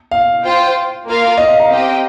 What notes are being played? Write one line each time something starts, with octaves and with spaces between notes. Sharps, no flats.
F5
F4 C5 G5
A#3 F4 A#4 F5
D#5
F5
F5 A#5
C4 G4 D#5 G5